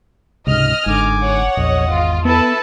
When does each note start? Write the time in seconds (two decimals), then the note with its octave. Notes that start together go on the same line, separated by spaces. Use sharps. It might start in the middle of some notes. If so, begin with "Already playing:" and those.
0.47 C#2 G#2 C3 D#5 F6
0.86 G1 G#2 D3 G#5 D6
1.23 C#5 F#5
1.57 A#1 E2 D#5
1.90 G#1 F4
2.25 B3 E4 A4 B4 A5 E6